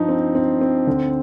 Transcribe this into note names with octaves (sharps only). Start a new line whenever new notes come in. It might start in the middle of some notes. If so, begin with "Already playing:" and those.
Already playing: G2 F3 D#4
C4
C4
C4
D2